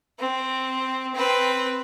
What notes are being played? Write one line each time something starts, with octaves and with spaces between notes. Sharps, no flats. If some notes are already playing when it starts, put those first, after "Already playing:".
C4
C4 B4